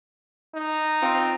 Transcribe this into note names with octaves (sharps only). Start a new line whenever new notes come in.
D#4
C4 F4